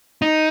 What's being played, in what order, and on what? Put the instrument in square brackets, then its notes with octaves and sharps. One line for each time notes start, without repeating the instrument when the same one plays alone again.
[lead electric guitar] D#4